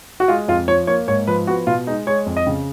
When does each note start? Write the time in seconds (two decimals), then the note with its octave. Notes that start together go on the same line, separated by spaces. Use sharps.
0.20 F#4
0.28 G#3 F4
0.48 F2 F4
0.68 F3 C#5
0.87 A#3 C#5
1.07 G#2 C#5
1.27 F3 B4
1.47 B3 F#4
1.67 B2 F4
1.87 G#3 D#4
2.07 G#3 C#5
2.26 F2
2.37 D#5
2.47 C#3